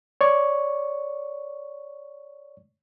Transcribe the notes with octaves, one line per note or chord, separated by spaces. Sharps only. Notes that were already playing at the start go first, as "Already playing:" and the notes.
C#5 D5 C#6